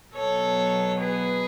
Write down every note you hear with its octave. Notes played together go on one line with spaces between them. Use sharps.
B2 F#3 B3 A4 C#5
G#4 B4